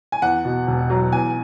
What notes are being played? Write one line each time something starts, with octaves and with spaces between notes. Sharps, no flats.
G#5
E2 F#5
B2
E1
F#3
E2 G#5